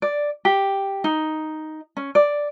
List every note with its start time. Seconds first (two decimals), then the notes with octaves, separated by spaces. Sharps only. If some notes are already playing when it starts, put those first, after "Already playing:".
0.02 D5
0.45 G4
1.04 D#4
1.97 C#4
2.15 D5